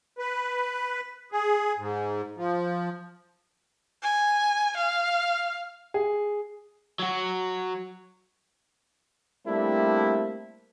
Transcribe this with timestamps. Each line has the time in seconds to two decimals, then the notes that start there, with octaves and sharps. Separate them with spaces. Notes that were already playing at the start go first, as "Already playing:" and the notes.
0.18 B4
1.32 G#4
1.78 G#2
2.37 F3
4.03 G#5
4.77 F5
5.94 G#4
6.99 F#3 F#4
9.46 G3 A3 A#3 C4 D4 E4